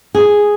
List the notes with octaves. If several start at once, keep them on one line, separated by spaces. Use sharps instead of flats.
G#4